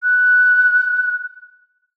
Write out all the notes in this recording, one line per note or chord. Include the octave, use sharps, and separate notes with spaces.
F#6